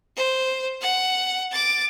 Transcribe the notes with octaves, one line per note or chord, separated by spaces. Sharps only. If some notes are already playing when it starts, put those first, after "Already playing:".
C5
F#5
D6 A6